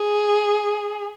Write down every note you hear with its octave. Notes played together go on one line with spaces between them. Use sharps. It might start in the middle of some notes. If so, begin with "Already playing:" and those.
Already playing: G#4